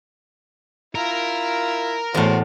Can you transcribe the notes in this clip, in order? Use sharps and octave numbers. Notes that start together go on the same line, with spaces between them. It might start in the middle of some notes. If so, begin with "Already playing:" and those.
E4 F4 A#4
E2 A2 C4 F#4 C6